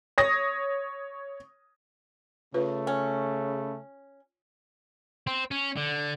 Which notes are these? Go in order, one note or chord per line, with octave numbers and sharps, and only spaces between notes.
C#5 D#6 A#6
C#3 A3 F4 B4
C#4
C4
C#4
D3